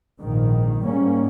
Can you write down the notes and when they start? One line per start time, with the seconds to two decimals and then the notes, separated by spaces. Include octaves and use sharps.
0.20 A#1 G#2 D#3
0.81 G#2 G3 A#3 C#4